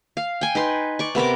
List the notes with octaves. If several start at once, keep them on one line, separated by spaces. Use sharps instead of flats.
F5
G5 G#5
D#4 B4 C6
D5 C#6
C3 B3 A#4 D6